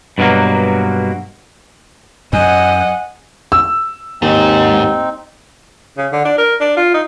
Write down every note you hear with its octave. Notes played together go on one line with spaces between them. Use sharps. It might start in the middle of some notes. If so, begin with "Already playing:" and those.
G2 B2 E3 F#3 A#3
F#2 D#5 F#5 G#5
E6
D#2 G#2 C4 D#4
C#3
D3
D4
A#4
D4
F4
D#4